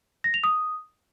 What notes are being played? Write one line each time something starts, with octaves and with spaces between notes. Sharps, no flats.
A#6
F7
D#6